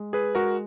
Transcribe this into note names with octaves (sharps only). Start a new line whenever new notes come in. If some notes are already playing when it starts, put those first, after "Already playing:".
Already playing: G#3
G#4 B4
G#3 F#4 A#4